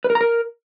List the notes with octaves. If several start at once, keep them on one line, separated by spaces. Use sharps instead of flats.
B4
A#4
A#5
A#4